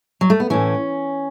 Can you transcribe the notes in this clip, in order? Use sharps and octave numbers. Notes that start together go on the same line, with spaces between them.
F#3
A3
B3
A2 E3 C#4